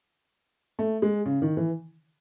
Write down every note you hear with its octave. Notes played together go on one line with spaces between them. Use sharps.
A3
G#3
C#3
D#3
E3